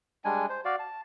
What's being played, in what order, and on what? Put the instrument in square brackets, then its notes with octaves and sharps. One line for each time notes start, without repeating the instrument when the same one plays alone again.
[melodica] G3 G#3 D4 G#5
C5
F#4 D5 F5
A5